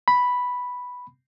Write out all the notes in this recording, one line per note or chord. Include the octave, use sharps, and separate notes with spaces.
B5